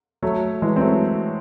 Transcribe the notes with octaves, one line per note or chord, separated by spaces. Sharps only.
F#3 A3
E3 G#3
C4
F#3 A3